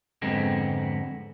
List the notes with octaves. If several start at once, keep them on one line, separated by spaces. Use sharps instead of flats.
F2 G#2 D3 G#3 B3 C4